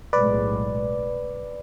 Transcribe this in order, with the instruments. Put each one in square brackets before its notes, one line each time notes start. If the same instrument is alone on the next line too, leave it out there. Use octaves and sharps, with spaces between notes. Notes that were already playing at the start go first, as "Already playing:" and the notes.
[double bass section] B1 A2 G#3 [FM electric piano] B4 D5